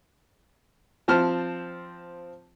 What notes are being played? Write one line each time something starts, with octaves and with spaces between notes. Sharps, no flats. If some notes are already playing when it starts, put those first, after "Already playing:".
F3 C4 A5 F6